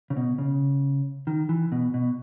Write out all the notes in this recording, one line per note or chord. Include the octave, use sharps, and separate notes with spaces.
C#3
B2
C#3
D#3
E3
B2
B2